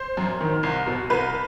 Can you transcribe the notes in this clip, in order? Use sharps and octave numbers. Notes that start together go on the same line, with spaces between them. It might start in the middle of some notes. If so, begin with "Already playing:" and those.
Already playing: C5
F#2
D#3
C2
B2
C2 B4